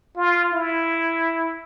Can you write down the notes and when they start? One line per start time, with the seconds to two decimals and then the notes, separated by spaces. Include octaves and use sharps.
0.17 F4
0.53 E4